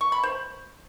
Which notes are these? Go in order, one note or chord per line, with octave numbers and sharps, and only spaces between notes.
C#6
B5
C5